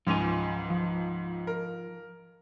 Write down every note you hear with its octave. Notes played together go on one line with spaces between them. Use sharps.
C#2 G#2 F3 G#5 F7
F3
A#4